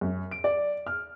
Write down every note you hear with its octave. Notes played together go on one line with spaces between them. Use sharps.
F#2
D7
D5
F6